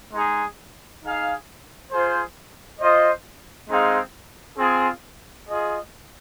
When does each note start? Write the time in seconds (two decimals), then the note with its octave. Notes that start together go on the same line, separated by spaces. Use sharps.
0.14 G#3 D#4 G#4
1.03 D#4 G#4 F5
1.91 F4 G#4 C5
2.81 F4 C5 D#5
3.69 G#3 C4 D#4 G#4 F5
4.58 C4 F4 G#4
5.47 F4 G#4 D#5